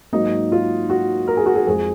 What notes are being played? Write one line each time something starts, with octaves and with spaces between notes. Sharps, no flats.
G#2 F#3 A#3 D#4
F4
F#4
A#4
G#4
F#4
G#4
F2 F3 G#3 G#4